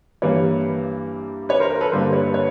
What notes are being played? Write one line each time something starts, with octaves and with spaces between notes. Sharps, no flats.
G2 E3 G3 A#3 B4 C#5
B4 C#5
A#4 C5
A#4
A4 B4
G2 D3 G3 A#3 A#4 C5
B4 C#5
B4 C#5